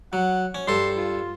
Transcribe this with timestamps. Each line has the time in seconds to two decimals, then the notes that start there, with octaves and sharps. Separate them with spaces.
0.13 F#3 F#5
0.55 C#4
0.68 G2 A4 C6
0.97 F4